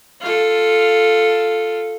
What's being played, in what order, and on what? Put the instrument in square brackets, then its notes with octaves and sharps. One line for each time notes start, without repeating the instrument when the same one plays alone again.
[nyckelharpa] F4 A4